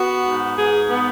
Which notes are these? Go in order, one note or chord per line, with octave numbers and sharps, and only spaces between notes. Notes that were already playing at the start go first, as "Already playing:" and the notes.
Already playing: B3 F#4
G#2
G#2 G#4
B3